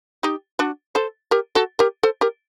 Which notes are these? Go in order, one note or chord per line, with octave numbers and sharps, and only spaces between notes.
D#4 G4
D4 F#4
A4 C5
G4 A#4
F#4 A4
G4 A#4
A4 C5
G4 A#4